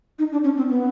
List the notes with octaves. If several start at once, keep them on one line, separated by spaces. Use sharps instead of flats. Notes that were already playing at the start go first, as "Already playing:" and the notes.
D#4
D4
C#4
C4
B3